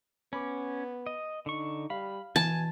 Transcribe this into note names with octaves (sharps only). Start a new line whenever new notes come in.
B3 C#4 B5 D6
D#5
D3 D#4 C#6
G3 F5 B5
B2 E3 G#5 A5